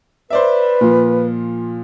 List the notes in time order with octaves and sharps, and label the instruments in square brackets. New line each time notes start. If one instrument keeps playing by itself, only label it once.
[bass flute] B4 [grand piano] C5 D5 E5
[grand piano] A#2 F3